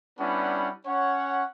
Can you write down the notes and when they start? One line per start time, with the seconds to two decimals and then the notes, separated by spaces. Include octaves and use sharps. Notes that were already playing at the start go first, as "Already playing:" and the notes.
0.19 G3 B3 C#4 D4 E4 F#5
0.87 C#4 C#5 F#5